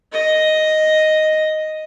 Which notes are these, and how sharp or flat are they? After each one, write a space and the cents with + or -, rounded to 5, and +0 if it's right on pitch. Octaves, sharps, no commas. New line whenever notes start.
D#5 +0